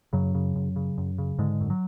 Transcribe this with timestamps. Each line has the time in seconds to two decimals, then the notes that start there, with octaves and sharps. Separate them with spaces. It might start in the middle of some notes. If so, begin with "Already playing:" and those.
0.13 F#2 C#3 F#3
0.35 C#3
0.56 F#2
0.76 C#3
0.98 F#2
1.18 C#3
1.39 G#2 D3 G#3
1.61 F#2
1.70 F#3